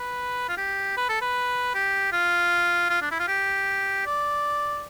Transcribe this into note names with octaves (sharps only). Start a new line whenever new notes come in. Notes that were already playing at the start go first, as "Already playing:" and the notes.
Already playing: B4
F4
G4
B4
A4
B4
G4
F4
F4
D4
E4
F4
G4
D5